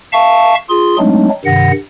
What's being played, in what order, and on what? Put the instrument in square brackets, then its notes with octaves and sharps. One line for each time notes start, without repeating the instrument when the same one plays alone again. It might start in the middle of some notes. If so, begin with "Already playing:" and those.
[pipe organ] E5 F5 A5 C#6
F4 G#4 C6
F#3 G#3 A3 C4 D4 D#4
G2 C3 D#3 F#5 A#6